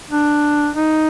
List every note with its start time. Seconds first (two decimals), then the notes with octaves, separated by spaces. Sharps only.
0.11 D4
0.75 D#4